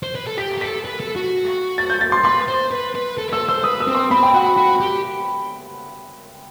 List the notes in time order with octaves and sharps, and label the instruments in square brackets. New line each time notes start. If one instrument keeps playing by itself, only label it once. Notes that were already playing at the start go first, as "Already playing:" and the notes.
[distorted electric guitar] C5
B4
A4
[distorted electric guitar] G4 [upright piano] B6
[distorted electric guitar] G4
[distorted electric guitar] A4 [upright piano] B6
[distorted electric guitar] B4
A4
F#4
[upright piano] A6
G6
A6
C6
[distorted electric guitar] B4 [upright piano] C6
[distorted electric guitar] C5
B4
B4
A4
B4
[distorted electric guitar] A4 [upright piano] E6
[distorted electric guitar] C5 [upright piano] E6
[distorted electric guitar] B4 [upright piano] D#6
[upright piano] E6
[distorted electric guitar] C4
[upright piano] C6
[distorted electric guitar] C4 [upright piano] B5
[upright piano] G5
[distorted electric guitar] F#4 [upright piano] F#5
[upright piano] B5
[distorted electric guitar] F#4 [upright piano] B5
[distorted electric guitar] G4